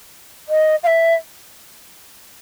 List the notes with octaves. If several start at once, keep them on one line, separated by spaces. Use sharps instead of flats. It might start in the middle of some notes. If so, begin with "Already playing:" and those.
D#5
F5
E5